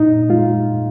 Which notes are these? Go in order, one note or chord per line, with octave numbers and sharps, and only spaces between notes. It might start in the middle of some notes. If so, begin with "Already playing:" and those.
Already playing: A#2 D#4
G#3 F4